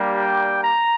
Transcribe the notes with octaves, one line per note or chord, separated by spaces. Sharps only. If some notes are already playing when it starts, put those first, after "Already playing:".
Already playing: G3 A#3 D4 G4
G5
A#5